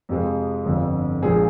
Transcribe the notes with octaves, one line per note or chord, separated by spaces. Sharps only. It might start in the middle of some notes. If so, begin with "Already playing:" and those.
F2 C3 F3 G#3
G1 F2 D3
A#1 A#2 F3 G#3 G#4